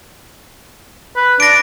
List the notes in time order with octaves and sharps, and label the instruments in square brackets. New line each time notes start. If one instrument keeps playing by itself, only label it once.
[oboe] B4
[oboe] D4 [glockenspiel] A#6 D7